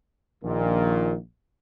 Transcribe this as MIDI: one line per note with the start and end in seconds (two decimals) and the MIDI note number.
0.44 1.15 34
0.44 1.15 46
0.44 1.15 51